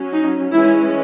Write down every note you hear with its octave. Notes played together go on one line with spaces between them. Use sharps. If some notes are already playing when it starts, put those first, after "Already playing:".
Already playing: F#3 C#4
D#4
E3 G#3 C#4 E4